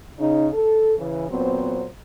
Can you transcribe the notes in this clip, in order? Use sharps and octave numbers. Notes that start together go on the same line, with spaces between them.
C#3 D#4
A4
C#3 E3
A#2 F#3 B3 C4 C5